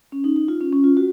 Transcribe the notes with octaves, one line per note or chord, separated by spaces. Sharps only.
C#4
D#4
D#4
F4
C#4
C#4
F4
F#4